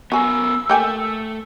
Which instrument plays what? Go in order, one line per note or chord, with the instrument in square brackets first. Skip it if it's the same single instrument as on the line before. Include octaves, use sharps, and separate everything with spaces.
[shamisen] F#3 G#5 [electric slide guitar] B3 A#4 [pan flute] E6
[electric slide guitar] A3 [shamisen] A#3 G5 G#5